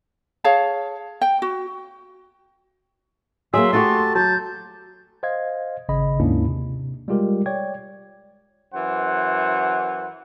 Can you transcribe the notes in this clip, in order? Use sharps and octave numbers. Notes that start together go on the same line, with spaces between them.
G#4 C#5 F5 A5
G5
F#4
F#3 G3 A#3 G#4 E5 C6
A3 F#4 G4 A5
F#3 A5 G6
C5 D#5 F5 G#6
G#1 C#3 D#5 B5
D#2 G#2 A#3 C#4 D4 E4
C3
G3 G#3 F4 G4 A#4
C#5 D5 G5 G#6
F#2 E3 C5 F#5